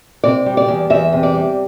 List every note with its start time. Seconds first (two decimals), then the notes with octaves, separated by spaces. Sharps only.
0.24 C3 D5
0.46 G3
0.57 D5
0.68 E2
0.90 E2 E5
1.12 C3
1.23 D5
1.34 G3